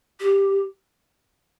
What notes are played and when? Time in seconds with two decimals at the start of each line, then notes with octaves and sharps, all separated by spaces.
0.20 G4